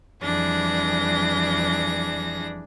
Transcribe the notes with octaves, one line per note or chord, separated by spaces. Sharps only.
F2 E3 G3 D4 G#4 A#6